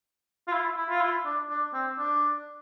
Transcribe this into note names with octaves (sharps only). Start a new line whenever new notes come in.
F4
E4
E4
F4
E4
D4
D4
C4
D4